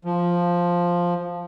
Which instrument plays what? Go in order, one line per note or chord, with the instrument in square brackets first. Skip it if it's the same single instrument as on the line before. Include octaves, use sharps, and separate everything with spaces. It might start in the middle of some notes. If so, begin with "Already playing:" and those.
[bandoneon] F3